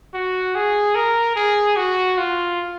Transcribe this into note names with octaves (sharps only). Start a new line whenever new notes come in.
F#4
G#4
A#4
G#4
F#4
F4